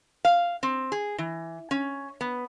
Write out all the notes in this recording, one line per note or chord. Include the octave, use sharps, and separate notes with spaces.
F5
C4
G#4
E3
C#4
B3